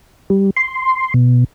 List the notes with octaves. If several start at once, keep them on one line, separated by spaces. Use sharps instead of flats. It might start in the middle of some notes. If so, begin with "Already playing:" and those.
G3
C6
B2